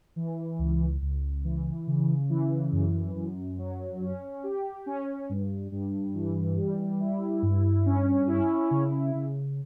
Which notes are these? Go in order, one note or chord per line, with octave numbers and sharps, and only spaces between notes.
E3
C#2
C#2
E3
C#3
E3
F#2
F#2
F#3
C#4
G4
C#4
G2
G2
E3
G3
E4
G2
C#4
E4
C#3
C#3